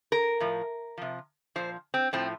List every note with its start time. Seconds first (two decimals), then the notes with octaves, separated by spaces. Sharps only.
0.12 A#4
0.40 A2 F3
0.98 C3 F3
1.56 A#2 F3 C5
1.94 C4
2.13 A2 F3 C4